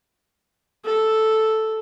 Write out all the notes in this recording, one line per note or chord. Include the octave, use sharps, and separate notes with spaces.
A4